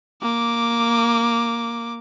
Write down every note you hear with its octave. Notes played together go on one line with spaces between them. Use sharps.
A#3 D6